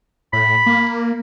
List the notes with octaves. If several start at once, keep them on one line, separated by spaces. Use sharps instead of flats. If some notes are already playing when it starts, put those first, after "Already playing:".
A2 B5
A#3